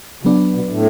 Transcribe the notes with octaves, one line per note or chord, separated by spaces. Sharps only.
C#3 F#3 B3 D4
B2
A2